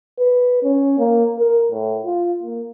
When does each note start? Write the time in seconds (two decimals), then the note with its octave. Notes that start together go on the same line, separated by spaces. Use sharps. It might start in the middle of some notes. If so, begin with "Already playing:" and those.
0.19 B4
0.63 C#4
0.98 A#3
1.39 A#4
1.71 A2
2.05 F4
2.43 A#3